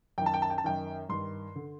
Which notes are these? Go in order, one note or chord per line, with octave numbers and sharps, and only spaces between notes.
F#2 D#3 G5 A5
G5
A5
G5
A5
F#2 D#3 G5
G2 D#3 C6
D3